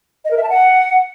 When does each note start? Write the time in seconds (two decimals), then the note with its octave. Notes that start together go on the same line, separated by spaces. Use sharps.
0.25 D#5
0.31 A#4
0.37 E5
0.43 A5
0.49 F#5